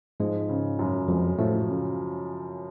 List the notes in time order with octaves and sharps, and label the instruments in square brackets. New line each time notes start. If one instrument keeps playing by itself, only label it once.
[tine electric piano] G#2 G#3 [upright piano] F3
[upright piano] C#3
F#2
[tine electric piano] F2 F3 [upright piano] G#3
[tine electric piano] A2 A3 [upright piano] F3
[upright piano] C#3